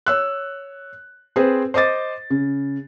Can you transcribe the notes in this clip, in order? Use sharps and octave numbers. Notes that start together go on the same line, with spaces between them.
C#5 E6 F#6
C4 G#4 B4 C5
C5 D#5 D6 A6
C#3